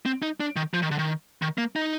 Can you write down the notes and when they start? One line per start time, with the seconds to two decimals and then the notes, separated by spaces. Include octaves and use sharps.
0.06 C4
0.22 D#4
0.40 D4
0.56 D#3
0.74 F3
0.82 D#3
0.91 D3
0.99 D#3
1.42 D#3
1.58 A#3
1.76 D#4